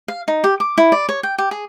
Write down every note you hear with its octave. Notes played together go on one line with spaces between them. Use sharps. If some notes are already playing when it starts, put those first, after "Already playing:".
F5
D#4
G4
D6
E4
D5
C#5
G5
G4
G#4